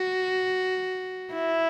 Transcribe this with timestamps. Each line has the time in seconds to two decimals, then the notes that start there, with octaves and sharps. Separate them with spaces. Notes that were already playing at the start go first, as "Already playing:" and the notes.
Already playing: F#4
1.33 E4